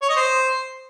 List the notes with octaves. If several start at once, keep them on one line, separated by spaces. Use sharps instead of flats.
C#5
D#5
C5